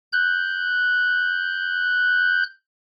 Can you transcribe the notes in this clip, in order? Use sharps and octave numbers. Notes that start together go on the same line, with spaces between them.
F#6 G6